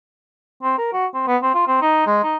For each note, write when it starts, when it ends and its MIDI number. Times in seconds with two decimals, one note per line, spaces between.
0.63 0.75 60
0.78 0.91 70
0.93 1.06 66
1.14 1.25 60
1.27 1.37 59
1.42 1.51 60
1.55 1.63 65
1.67 1.80 60
1.82 2.06 63
2.07 2.19 56
2.23 2.37 63